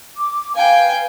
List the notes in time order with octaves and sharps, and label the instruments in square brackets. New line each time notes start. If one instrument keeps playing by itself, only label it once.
[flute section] D6
[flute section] B4 F5 [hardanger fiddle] G5 G#5